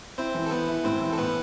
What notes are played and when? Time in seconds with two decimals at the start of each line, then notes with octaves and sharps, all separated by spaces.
0.18 C4 E4 C5
0.34 E3
0.46 A4
0.51 E3 B3 B4
0.68 E4
0.84 A2 C4 C5
1.01 E3
1.12 A4
1.18 A2 B3 B4